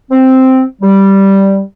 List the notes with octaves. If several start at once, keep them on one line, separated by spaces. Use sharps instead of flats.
C4
G3